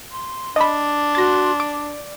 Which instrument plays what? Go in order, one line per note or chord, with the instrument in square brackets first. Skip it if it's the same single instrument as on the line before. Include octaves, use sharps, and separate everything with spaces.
[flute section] C6
[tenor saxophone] D4 [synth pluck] D#5 B5
[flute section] F#4 C6 [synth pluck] A6 A#6
[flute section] D5 [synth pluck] D6